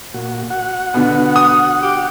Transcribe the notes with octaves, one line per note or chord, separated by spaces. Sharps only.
A#2 F#4
F#4 F#5
B2 D3 B3
D#6
G4